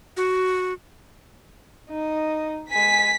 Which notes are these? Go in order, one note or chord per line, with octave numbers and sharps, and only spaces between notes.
F#4
D#4 D#5
G#3 G#5 B6